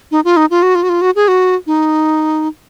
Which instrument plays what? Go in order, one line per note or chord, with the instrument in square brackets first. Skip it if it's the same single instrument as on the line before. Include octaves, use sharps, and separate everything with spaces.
[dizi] D#4
F4
D#4
F4
F#4
F4
F#4
F4
F#4
G#4
F#4
D#4